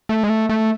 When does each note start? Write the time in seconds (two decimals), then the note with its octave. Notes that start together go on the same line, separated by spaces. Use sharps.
0.09 A3
0.23 G#3
0.30 A3
0.49 A3